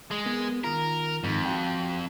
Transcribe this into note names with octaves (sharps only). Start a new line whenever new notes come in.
G#3
B3 A#4
D#3 F4 A#4
F2 G#2 D#3
F#4 F5 G5